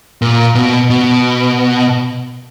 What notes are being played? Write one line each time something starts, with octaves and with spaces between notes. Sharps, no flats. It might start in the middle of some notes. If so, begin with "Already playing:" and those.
A#2
B2
B2